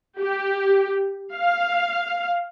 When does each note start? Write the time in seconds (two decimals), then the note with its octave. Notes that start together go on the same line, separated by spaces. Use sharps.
0.19 G4
1.34 F5